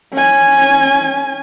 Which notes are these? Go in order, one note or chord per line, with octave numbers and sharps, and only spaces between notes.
C#4 G#5